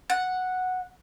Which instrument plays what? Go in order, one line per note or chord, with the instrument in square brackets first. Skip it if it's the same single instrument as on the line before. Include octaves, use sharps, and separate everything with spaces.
[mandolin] F#5